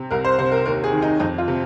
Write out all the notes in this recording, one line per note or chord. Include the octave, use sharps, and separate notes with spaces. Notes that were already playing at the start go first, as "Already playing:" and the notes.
Already playing: C3
C2 A#4
C5
C3 C5
A#4
D#2 A#4
G#4
D#3
D#4
F2 D#4
F4
C3